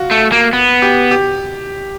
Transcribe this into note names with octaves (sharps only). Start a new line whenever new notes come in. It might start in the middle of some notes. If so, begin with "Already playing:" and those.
Already playing: F4 F#4
A3
A#3
B3
G4
G4